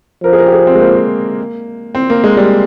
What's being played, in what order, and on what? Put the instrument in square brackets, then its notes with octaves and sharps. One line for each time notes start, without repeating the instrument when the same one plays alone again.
[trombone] F3 [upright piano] A#4
[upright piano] G#4
A#4
G4
G#4
C4
G#3
A#3
C4
A#3
G#3
G3